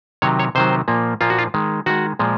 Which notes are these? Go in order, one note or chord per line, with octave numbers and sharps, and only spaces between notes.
C3 D#3 F#3 C#5
C#5
C3 D#3 F#3 C5
A#2 F3 A#3
A#2 F3 A#3 F4
F#4
F4
D#3 G#3
D#3 G#3 F#4
A#2 F3 G#3